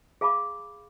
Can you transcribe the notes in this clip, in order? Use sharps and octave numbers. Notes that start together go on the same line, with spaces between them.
G#4 F5 A5 B5 D6